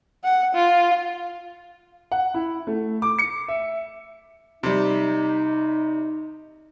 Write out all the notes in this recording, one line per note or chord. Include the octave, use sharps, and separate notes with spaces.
F#5
F4
F#5
E4
A3
D6
C#7
E5
C3 G3 D#4